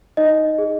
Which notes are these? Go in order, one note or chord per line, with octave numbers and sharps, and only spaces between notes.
D#4 D#5
G#4